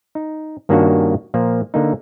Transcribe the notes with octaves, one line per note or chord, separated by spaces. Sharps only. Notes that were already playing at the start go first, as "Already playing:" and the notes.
D#4
G2 D#3 A#3 C#4 D4 F#4
A#2 F3 A#3
D3 A#3 D#4